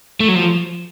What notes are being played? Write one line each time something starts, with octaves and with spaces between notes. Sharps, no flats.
A3
F#3
F3